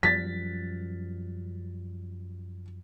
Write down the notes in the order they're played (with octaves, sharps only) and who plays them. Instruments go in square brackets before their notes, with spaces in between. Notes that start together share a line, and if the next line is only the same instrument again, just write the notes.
[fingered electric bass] F#2 F3 G3 [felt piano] A6 B6